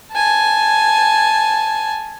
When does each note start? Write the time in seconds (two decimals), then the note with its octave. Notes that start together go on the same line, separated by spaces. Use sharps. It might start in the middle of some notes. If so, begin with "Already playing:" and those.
0.12 G#5 A5